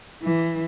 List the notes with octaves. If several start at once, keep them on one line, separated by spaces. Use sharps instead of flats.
E3